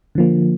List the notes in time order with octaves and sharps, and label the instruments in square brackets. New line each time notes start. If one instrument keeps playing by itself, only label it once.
[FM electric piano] D3 F3 A#3